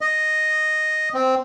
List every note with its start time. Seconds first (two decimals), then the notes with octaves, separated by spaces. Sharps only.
0.01 D#5
1.14 C4